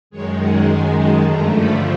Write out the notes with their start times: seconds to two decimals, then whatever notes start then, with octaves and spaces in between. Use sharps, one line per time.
0.10 F#2 D#3 G#3 C#5
0.39 F#5
0.69 G#5
0.98 A5
1.26 G2 D3 F3 A3 A#5
1.56 B5